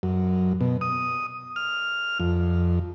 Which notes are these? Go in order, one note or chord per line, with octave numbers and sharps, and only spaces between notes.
F#2
B2
D#6
F6
F2